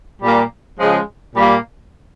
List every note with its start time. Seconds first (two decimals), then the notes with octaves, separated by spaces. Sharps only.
0.22 A#2 G3 A#3
0.79 C#3 F3 G#3
1.35 A#2 G3 A#3